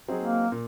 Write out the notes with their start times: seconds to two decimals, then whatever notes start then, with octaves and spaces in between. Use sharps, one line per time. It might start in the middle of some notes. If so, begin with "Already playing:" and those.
0.08 F#3 C4 D#4 G#4
0.22 A#3
0.52 A#2